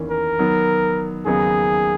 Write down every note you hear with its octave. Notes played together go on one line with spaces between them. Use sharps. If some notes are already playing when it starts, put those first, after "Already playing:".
Already playing: E2 D#3 A#3 C#4
A#4
D#3 F#3 B3
D#2 C#3 F#3 B3 D#4 G#4